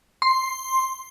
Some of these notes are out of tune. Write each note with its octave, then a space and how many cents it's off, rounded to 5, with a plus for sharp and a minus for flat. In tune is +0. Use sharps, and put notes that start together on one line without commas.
C6 +5